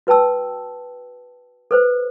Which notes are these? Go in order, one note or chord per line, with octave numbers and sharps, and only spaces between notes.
F#4 B4 G5 A5 E6
A4 B4 C5